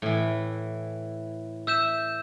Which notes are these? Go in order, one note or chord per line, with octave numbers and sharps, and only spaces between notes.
A2 E3
E5 E6 G6 E7